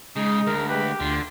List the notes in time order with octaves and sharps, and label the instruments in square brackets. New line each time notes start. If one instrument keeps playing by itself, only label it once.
[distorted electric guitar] C#3 G#4 [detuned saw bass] G#3 [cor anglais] D#4
[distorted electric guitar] D2 [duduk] A#4
[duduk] G4 [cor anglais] B4
[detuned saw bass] D2 [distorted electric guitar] D3 [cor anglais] F4